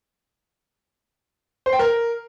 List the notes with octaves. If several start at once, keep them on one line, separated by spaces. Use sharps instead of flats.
C5
G5
A#4